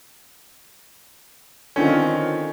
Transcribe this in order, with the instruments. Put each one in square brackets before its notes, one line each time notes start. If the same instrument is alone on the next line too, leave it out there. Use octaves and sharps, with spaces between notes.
[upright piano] D3 F4 [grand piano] D#3 C4 C#4